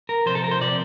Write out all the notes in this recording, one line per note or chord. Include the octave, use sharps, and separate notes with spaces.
A#4
C3 F3 C5
A4
A#4
C5
C3 F3 D5